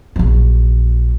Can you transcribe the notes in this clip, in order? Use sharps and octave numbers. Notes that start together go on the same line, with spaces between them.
A#1 F#3